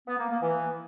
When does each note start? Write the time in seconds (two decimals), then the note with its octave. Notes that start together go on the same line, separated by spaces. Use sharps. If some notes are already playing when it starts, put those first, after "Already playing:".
0.08 B3
0.19 A#3
0.30 A#3
0.42 E3